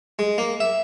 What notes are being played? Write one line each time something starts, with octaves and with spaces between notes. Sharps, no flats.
G#3
A#3
E5